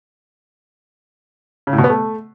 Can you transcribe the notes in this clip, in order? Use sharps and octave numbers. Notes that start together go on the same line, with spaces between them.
C#3
A2
B2
B3
A3